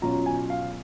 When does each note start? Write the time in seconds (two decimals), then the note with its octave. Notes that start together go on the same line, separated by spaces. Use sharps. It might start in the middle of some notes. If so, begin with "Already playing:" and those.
0.02 B2 F#3 C#4 F4 A#5
0.26 G#5
0.50 F5